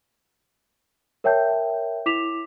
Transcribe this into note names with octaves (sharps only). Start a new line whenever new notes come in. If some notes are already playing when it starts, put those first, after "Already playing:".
A#4 C#5 E5 G5 A5 G6
E4 D6 B6 E7 F7